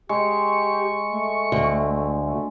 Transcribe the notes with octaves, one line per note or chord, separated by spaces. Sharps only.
G#3 G4 C#6
A3
D2
A3